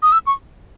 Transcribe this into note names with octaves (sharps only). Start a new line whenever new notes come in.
D#6
E6
C#6